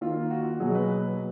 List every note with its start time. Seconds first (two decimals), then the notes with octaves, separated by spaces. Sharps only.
0.01 D#3 A#3 F4
0.30 F#4
0.60 B2 F#3 A#3 G#4
0.75 B4